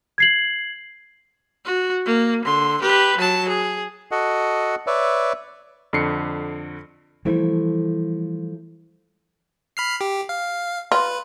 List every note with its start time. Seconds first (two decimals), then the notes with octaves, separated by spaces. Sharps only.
0.18 G#6 C7 F#7
1.65 F#4
2.06 A#3
2.45 D3 C6
2.81 G4 B4
3.17 F#3 A5
3.48 G#4
4.11 F#4 A4 D#5 F#5
4.87 B4 C#5 D5 E5
5.93 F2 D3 C7 C#7
7.25 E3 F3 G3 A3 E4
9.77 B5 F6 C7
10.01 G4
10.29 F5
10.92 F4 B4